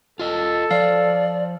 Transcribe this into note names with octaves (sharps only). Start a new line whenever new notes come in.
F4 A4 D#5
F3 D5 F5